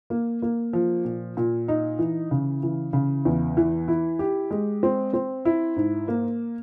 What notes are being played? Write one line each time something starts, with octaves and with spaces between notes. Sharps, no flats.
A#3
A#3
F3
A#2
A#2
D#4
E3
C#3
E3
C#3
E2
E3
E4
G4
G#3
C4
C4
E4
G#2
A#3